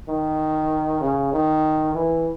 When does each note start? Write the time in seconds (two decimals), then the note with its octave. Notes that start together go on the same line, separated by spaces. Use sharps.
0.08 D#3
1.01 C#3
1.33 D#3
1.94 E3